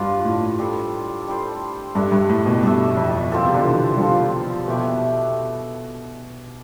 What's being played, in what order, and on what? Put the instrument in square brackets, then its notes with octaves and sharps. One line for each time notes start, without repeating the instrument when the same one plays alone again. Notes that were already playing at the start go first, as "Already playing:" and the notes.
Already playing: [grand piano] G2 [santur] D4 F4 B4
[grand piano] A2
[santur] G3 D4 A4 C5
G3 D4 A4 C5
[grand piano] G2 [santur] D4 A4 E5
[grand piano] G2
A2
B2
[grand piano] G2 [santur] D4 A4 E5
[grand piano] F2
[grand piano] B2 [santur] C4 F4 A4
[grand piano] C3
D3
E3
G3
[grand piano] F3 [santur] C4 F4 A4
[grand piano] B2 [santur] A3 E4 G4 B4